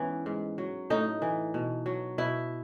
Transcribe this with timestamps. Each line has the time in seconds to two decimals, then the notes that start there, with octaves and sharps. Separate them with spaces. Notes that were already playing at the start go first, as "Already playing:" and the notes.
Already playing: G#2 E3 B3 C#4
0.26 G#2
0.58 F#3
0.90 A2 D#4
1.22 E3
1.54 B2
1.86 F#3
2.18 B2 E4